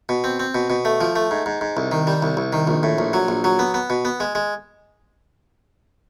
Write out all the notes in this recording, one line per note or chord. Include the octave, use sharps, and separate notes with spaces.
B2
C4
C4
B2
B2
A3
F3
A3
G#2
G#2
G#2
C2
D#3
G3
C2
C2
D#3
A#1
A2
A#1
F#3
A#1
F#3
B3
B3
B2
B3
G#3
G#3